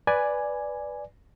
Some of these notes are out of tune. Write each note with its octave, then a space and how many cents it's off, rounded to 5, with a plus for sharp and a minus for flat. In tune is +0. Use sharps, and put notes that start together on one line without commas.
B4 +0 D5 +0 G#5 +0